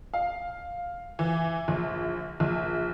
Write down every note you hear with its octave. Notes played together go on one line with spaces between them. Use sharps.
F5
E3
A#1
A#1